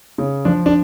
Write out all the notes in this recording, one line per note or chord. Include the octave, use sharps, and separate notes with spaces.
C#3
F3 D4
D4